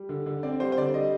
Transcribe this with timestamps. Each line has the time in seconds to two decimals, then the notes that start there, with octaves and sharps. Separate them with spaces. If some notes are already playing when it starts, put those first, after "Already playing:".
Already playing: G3
0.09 D3
0.26 D3
0.43 C4 D5
0.60 G3 C5
0.72 C5
0.78 D3 D5
0.94 G3 D#5